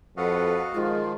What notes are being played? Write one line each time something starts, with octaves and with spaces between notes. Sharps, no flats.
F2 F#4 A4 B4 D#5 F5 F#5
D#3 F3 G#3 F4